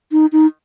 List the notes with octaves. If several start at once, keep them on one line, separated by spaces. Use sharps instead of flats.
D#4
D#4